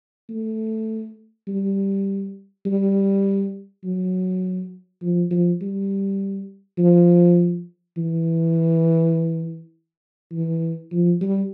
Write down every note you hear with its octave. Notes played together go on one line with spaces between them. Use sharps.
A3
G3
G3
F#3
F3
F3
G3
F3
E3
E3
F3
G3